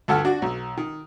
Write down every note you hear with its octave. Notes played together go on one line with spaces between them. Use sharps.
D2 G2 A4 F#5 A5 F6
D4 F#4
B1
D#3